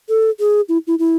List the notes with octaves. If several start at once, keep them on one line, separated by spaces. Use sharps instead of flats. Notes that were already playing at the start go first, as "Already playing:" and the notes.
A4
G#4
E4
E4
E4